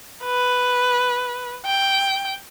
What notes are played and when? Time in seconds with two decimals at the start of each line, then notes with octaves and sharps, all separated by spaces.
0.24 B4
1.66 G5